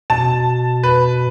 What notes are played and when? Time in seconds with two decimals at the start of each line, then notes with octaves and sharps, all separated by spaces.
0.10 B2 A5
0.83 B4